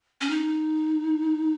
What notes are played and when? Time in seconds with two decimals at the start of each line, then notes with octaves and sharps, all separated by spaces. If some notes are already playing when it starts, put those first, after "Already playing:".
0.21 C#4
0.30 D#4